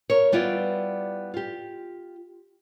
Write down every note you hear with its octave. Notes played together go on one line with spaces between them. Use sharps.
A#4 C#5
G3 B3 E4 F4 D5
F4 G4